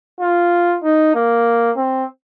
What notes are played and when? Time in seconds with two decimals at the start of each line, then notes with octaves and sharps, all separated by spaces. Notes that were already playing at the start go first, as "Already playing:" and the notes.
0.20 F4
0.84 D#4
1.15 A#3
1.77 C4